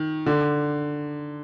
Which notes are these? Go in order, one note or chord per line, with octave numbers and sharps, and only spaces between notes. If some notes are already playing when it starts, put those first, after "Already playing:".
Already playing: D#3
D3